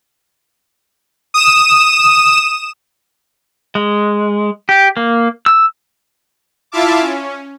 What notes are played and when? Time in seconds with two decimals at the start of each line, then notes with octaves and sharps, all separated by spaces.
1.34 D#6 E7
3.75 G#3
4.69 G4
4.97 A#3
5.46 E6
6.72 E4 F4 E5 F5 A5 D6
7.00 C#4